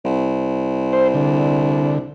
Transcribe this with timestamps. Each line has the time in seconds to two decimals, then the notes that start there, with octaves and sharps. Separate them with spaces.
0.05 C2
0.93 C5
1.15 D3